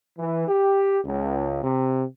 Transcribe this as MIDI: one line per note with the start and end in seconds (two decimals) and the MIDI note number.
0.18 0.48 52
0.48 0.99 67
1.04 1.61 37
1.63 2.04 48